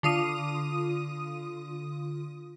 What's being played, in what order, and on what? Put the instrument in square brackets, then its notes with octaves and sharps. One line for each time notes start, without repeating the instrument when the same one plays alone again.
[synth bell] D3 F4 D#6 D#7